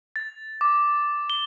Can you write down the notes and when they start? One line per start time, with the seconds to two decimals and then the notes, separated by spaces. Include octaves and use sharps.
0.16 A6
0.61 D6
1.30 G7